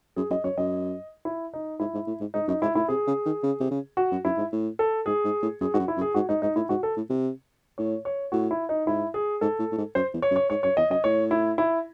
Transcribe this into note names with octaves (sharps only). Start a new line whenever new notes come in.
F#2 G#4
F#2 D#5
F#2 C#5
F#2 D#5
E4
D#4
G#2 E4
G#2
A2
G#2
G#2 D#4
F#2 D#4
G#2 E4
A2 E4
C3 G#4
C#3
D#3
C#3
C3
C#3
F#4
F#2
F#2 E4
G#2
A2
A4
G#2 G#4
G#2
A2
F#2 G#4
G#2 F#4
F#2
E4
F#2
G#4
G#2 F#4
G#2 D#4
G#2 D#4
A2 E4
G#2 F#4
A4
A2
C3
A2 C#5
C#5
A2 F#4
E4
D#4
G#2 E4
G#4
G#2 A4
A2
A2
G#2
F#2 C5
E2
C#5
F#2
C#5
G#2 C#5
F#2 C#5
E2 D#5
F#2 D#5
A2 C#5
E4
E4